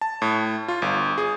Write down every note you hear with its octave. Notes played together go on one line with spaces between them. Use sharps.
A5
A2
F4
G1
G#4